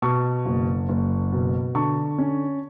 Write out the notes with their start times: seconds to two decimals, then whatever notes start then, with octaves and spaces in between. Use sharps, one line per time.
0.02 B2 A5 C#6
0.46 F#1
0.89 F#1
1.32 B2
1.75 D3 A5 C#6
2.18 C#4